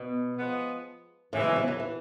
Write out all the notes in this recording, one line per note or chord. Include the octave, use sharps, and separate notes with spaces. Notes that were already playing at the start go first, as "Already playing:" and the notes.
Already playing: B2
F3 G#3 B3
F#2 A2 C#3 E3 G#3
B2
C3
F#3
E3